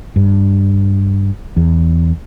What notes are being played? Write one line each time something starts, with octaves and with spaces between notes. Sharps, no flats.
G2
E2